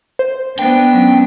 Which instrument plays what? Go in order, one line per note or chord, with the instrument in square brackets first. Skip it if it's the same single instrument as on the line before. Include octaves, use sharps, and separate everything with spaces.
[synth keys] C5
[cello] B3 D4 [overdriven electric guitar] G5
[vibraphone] F#3 G#3 C#4